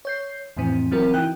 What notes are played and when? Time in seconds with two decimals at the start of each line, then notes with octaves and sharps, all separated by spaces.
0.05 C#5 G6 C7
0.57 F2 A2 E3 C4
0.91 E3 F#3 C4 F#4 A#4
1.14 E3 D#4 E4 G5 F#6